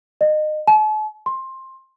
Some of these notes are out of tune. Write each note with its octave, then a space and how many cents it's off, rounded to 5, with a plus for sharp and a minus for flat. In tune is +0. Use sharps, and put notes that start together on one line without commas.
D#5 -25
A5 -45
C6 +15